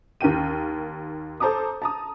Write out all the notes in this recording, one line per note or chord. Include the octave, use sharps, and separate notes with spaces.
D#2 A#4 G5 D#7
A4 C5 A5 A#5 D6 D#6
A5 A#5 D#6